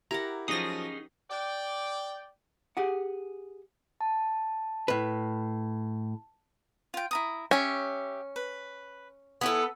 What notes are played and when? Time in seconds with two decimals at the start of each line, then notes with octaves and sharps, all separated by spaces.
0.11 E4 G4 A#4 F#5 A#5
0.48 F3 F#3 C#4 D#4 G#4 D#6 A#6
1.30 D5 G5
2.77 G4 G#4 F#5
4.01 A5
4.88 A2 B4
6.94 F4 G5
7.11 E4 A#5 D#6
7.51 C#4 G4 E5
8.36 B4
9.41 B3 E4 A4 G#5